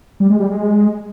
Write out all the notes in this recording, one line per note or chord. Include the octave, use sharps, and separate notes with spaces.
G3
G#3
G3
G#3